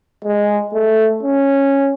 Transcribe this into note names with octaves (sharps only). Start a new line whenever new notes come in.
G#3
A3
C#4